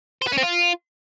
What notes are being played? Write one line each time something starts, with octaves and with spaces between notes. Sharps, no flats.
C5
B4
C#4
C4
F4